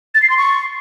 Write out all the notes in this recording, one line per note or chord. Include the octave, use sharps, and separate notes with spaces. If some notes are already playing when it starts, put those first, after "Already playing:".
A6
C7
C6
C#6